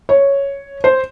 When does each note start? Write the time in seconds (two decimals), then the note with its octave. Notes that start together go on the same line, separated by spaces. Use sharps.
0.09 C#5
0.84 C5